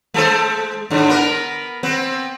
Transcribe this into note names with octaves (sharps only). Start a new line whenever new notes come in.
G#3 A4 C5
G#2 D3
B3 A#4
B3 C4